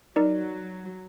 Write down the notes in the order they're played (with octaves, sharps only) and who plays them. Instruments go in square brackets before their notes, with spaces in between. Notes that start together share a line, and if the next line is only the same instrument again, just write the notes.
[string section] F#3 [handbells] D#4 A#4 D5